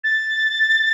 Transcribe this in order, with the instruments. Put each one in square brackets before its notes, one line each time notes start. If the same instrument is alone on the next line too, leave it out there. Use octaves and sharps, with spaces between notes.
[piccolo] A6